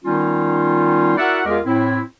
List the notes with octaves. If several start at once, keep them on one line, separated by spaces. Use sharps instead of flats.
D#3 G3 B3 C#4 D#4 F4
E4 F#4 A#4 D5 E5 F#5
E2 G#3 F4 G4 G#4 A#4
A2 C4 E4